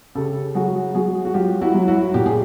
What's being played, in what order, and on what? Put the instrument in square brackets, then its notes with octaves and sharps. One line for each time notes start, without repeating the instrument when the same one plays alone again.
[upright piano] C#3 G4 A4
F#3 F#4 G#4
F#3 F#4 G#4
F#4
F#3 F4 G4
E4 F#4
F#3
E4 F#4
A#2 G4
G#4